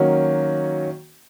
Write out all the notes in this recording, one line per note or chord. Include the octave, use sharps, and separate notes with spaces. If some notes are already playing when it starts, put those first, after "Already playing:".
Already playing: D#3 F#3 A#3 C#4 F#4